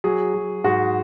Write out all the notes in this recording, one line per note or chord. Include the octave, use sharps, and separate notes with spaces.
F#3 G#4
F#3
G#2 F#4